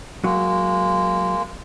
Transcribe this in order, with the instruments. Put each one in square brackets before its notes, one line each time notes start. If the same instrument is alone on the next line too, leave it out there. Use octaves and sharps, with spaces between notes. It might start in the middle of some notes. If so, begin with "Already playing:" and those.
[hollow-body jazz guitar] F#3 [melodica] G#3 A#3